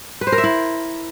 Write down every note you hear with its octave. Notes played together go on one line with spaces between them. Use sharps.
B4
C5
A#4
E5
E4